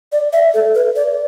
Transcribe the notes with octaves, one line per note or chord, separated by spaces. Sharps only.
D5
E5
A4
B4
D5